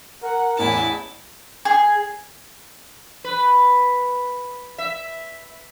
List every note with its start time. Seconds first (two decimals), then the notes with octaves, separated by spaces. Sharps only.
0.23 A#4 F#5
0.59 A1 E2 E4 G#5 A5
1.65 G#4
3.24 B4
4.78 E5